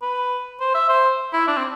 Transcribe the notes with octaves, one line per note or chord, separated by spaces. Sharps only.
B4
C5
E5
C5
E4
D4
C4